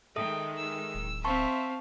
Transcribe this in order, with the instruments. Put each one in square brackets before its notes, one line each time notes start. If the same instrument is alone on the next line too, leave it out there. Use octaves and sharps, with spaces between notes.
[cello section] D#3 G#3 [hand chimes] A4 E5 D#6 [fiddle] G5
[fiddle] E6
[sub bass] D1
[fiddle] C4 F5 [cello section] E5 [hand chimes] A5 C6 C#6